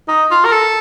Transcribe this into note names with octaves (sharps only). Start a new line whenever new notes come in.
D#4
F4
A#4
A4